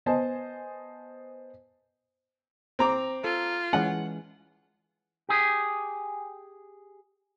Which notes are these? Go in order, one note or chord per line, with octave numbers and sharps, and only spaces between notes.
B3 C5 D#5 G#5 A5
C4 A#5 D6
F4 A4
E3 G#3 C#4 F#5
G4 G#4